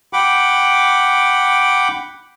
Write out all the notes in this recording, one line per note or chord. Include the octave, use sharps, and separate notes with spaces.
F#5 G5 B5 D6